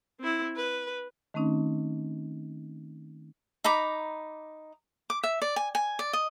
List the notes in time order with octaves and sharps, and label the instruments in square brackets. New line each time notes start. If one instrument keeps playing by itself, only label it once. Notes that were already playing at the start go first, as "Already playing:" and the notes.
[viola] C4 E4
B4
[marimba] D#3 A3 C4 C#4 D#4
[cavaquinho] D#4 A#5 B5 D6
D6
E5
D5
G#5
G#5
D5
D#5